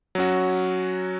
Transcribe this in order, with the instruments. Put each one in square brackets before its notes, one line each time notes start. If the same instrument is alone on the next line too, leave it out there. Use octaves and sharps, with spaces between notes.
[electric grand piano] F#3 C#4 F#4